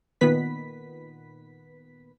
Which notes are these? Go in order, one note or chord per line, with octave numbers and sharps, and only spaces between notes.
A#2 D#3 B3 B4 B6